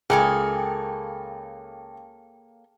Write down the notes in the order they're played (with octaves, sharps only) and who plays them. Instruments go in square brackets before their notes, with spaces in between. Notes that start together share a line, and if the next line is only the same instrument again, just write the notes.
[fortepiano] C#2 [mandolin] A#3 A4 C#5 [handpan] G#4 [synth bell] G5